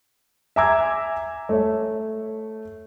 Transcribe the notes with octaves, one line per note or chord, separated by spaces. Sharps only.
E5 G#5 A#5 D6 E6 G#6
A3 C#5